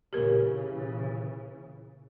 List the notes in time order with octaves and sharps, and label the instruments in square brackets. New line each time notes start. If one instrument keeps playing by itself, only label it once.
[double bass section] A#2 C#3 E3 [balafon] G4 A#4